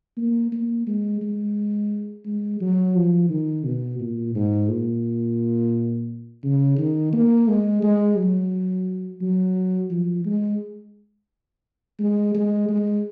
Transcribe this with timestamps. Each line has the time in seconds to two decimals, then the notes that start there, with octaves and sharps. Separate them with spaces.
0.17 A#3
0.52 A#3
0.87 G#3
1.22 G#3
2.26 G#3
2.61 F#3
2.95 F3
3.30 D#3
3.65 B2
4.00 A#2
4.35 G#2
4.69 A#2
6.44 C#3
6.78 D#3
7.13 A#3
7.48 G#3
7.83 G#3
8.17 F#3
9.21 F#3
9.91 F3
10.26 G#3
12.00 G#3
12.35 G#3
12.69 G#3